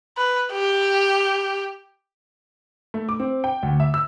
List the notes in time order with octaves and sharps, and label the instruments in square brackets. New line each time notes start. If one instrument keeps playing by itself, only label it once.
[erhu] B4
G4
[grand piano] A3
D6
C4
G5
D2
E5
E6